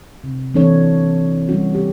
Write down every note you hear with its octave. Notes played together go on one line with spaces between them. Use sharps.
C3
E3 A#3 C4 D4 A4 C#5
G3 C#4 F#4
G4